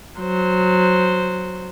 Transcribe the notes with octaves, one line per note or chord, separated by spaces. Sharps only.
F#3 C5